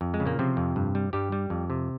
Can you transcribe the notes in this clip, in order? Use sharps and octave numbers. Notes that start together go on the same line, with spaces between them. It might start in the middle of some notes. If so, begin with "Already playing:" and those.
F2
G#3
C#3
A#2 A#3
C3 F3 C4
F2
G2
G3
G2 G3 G4
G3
F2
C3